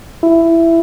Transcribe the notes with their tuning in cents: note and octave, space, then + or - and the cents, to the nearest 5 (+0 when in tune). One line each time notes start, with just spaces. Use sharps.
E4 +10